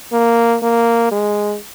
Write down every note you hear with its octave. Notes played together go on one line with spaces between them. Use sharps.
A#3
A#3
G#3